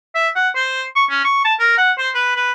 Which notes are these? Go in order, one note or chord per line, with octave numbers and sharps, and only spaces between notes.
E5
F#5
C5
C#6
C#4
C#6
A5
A#4
F#5
C5
B4
B4